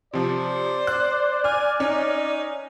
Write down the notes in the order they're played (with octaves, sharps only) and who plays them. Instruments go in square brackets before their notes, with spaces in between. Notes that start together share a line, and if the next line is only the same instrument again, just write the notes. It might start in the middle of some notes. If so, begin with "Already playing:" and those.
[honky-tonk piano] C3 F3 [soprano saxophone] C5 [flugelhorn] D5
[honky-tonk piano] F#6
[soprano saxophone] G#5 [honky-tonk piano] F6
[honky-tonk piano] C#4 [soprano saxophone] D#4